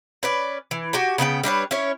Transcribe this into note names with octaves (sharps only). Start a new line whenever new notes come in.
C#4 B4 D5
E3
F#4 G4 G5 G#5
C#3 B3 A#4 G5
G3 D4 B4 C#5
C#4 E4 C#5